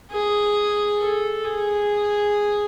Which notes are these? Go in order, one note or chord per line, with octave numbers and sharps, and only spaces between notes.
G#4
A4
G#4